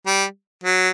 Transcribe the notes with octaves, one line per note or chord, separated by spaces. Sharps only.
G3
F#3